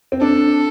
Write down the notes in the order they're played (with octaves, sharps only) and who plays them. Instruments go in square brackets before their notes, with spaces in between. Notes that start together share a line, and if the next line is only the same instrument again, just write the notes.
[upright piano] C4
[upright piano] D4 [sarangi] A4